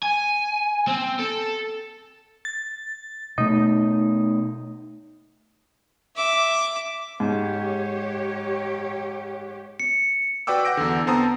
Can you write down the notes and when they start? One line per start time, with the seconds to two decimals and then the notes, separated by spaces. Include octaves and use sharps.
0.03 G#5
0.88 C4
1.20 A4
2.45 A6
3.38 B2 A3 D#4
6.16 E5 D6
7.20 G#2 G4 C#5
9.80 C#7
10.47 F#4 B4 D5 G5 D6 E6
10.65 F#5 D6 G6 A#6 D7
10.77 E2 D3
11.07 B3 C4 C5 A5 A#5 D#6